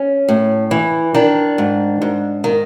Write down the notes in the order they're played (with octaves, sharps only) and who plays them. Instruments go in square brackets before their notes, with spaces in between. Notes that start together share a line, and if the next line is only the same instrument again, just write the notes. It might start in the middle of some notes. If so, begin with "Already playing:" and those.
Already playing: [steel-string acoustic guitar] C#4
A2
E3
D#3 D4
G#2
G#2
D#3